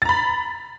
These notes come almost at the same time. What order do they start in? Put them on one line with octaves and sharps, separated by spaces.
A6 A#5 B5